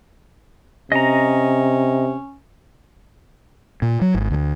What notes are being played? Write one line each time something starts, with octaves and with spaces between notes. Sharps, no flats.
C3 C#4 D#5 A#5
A#2
F#3
G#1
D2